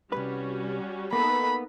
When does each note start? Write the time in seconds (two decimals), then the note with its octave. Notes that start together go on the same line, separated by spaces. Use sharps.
0.12 C2 F#2 G3 C#4 F#4 B4
1.13 A#3 B3 D#4 A4 B4 B5